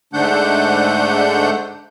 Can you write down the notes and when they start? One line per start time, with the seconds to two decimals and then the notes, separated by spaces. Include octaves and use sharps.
0.13 G#2 D3 A3 D4 F#5 G6